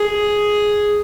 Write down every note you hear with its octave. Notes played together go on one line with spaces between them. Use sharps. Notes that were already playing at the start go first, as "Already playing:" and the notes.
Already playing: G#4